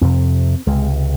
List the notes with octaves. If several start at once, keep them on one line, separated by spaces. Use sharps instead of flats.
F2 C3 C4
C#2 C3 G#3